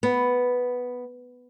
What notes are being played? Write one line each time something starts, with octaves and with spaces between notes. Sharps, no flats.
B3